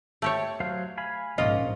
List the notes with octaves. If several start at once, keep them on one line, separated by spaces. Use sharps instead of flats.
A3 G4 C#5
F#3 C5 F5
F5 G#5 B5
A#1 G#2 A#3 C#4 F4 D#5